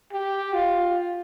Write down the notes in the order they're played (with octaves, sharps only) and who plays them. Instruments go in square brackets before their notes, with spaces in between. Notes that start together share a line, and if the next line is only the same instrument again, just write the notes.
[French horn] G4
F4